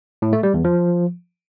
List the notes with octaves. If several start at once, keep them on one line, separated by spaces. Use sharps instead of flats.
A2
A3
G3
E2
F3